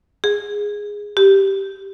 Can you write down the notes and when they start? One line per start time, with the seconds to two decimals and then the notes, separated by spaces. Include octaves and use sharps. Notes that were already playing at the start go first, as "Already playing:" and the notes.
0.24 G#4
1.17 G4